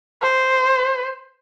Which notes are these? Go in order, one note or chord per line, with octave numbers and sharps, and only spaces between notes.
C5